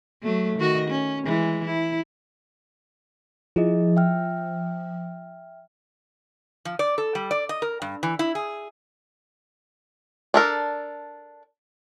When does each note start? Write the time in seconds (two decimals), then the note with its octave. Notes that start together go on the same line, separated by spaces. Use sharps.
0.22 F#3 A3
0.59 D#3 F#4 D#5
0.90 C#4
1.26 E3 G#3
1.65 E4
3.56 F3 E4 G#4 D#5
3.96 E5 G5 F6
6.65 F3
6.79 D5
6.98 A4
7.15 G3
7.31 D5
7.49 D#5
7.62 A#4
7.82 G2
8.03 E3
8.19 E4
8.35 G#4
10.34 D4 A4 A#4